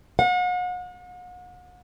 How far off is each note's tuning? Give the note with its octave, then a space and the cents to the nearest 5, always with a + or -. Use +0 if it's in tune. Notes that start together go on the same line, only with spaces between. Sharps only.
F#5 -40